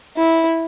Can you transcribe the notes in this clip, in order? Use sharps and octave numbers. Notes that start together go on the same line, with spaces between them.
E4